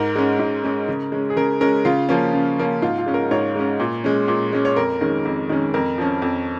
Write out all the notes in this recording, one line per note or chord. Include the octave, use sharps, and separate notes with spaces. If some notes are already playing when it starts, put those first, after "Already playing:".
Already playing: G#2 A#4
G#3 C#4
G#2
G#3 C#4
C#3
G#3 C#4
G#4
C#3 A#4
G#3 C#4 A#4
C#3 F4
F3 A#3 C#4
C#3
F3 A#3 C#4
G#2 F4
F4
G#3 C#4
A#4
G#2 C#5
G#3 C#4
A#2
G#3 C#4
A#2
G#3 C#4
C#5
F2 A#4
D#3 G#3 C#4
F2
D#3 G#3 C#4
F2 A#4
F3 C#4
F2